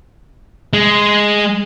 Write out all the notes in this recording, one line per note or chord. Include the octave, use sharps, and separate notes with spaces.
G#3